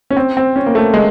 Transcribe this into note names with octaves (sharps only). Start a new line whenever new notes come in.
C#4
C4
C4
C#4
A#3
A3
G#3